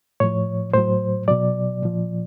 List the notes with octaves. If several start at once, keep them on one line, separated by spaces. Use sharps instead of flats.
A2 F3 C#5
A2 F#3 C5
B2 F#3 D5
A#2 F3